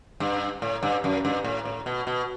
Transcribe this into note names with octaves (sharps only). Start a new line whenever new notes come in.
G2
A2
G2
F#2
G2
A2
A2
B2
B2